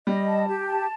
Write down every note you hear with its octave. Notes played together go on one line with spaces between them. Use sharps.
G3 D#5
A5
G4
A5